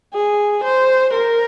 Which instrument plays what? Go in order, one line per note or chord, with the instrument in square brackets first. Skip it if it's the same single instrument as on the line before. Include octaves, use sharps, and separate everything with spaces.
[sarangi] G#4
C5
A#4